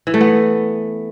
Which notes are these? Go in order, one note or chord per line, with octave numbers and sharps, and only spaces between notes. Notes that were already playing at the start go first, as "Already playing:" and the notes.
E3
A3
B3